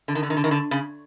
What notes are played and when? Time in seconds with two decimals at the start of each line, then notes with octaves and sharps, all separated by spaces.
0.08 D3
0.15 D#3
0.23 D3
0.30 D#3
0.37 D3
0.44 D#3
0.51 D3
0.71 C#3